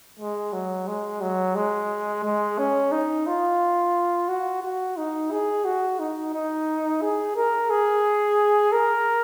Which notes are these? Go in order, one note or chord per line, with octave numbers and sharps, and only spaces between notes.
G#3
F#3
G#3
F#3
G#3
G#3
C#4
D#4
F4
F#4
F#4
D#4
G#4
F#4
D#4
D#4
G#4
A#4
G#4
A#4